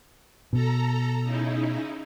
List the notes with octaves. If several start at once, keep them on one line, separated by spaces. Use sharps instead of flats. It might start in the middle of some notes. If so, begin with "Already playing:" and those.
B2 A4 A#5
C#3 D#4 E4